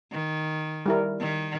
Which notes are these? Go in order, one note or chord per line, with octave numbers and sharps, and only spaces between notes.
D#3
G3 E4 A#4
D#3